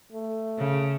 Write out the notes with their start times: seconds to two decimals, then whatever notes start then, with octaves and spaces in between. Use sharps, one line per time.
0.12 A3
0.59 C#3